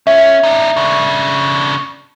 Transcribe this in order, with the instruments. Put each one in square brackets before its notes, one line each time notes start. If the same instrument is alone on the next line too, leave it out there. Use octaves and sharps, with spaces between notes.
[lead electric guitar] C#4 [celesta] E5
[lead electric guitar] D4 D#4
C#3 D4